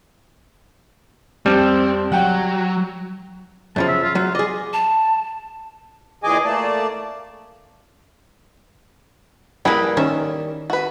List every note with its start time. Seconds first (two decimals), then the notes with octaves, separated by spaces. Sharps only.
1.46 F2 G3 C4
2.12 F#3 F#5 G5
3.76 F#2 C#3 F3 A5
3.89 E5
4.03 F4
4.15 F#3 F4
4.35 G#4 D5 D#5
4.73 A5
6.24 A#2 E3 G#4 D#5 G#5 D6
6.45 A3 A#3 D5 A5
9.65 G3 A#3 E4 G#4 B4
9.97 D#3 C#4 E5
10.70 F#4 B4